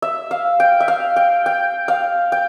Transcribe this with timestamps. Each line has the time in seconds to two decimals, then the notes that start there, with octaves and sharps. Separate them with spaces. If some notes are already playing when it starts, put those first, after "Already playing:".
0.02 E5
0.31 F5
0.60 G5
0.80 E5
0.88 F5
1.16 G5
1.46 G5
1.88 F5
2.32 G5